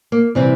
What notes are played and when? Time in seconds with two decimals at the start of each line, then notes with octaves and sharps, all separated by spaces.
0.12 A#3
0.35 C3 E3 G3 C4